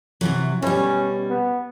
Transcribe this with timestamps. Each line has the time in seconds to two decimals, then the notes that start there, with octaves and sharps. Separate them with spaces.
0.21 C3 E3 F#3
0.62 B2 G3 C#4
1.30 B3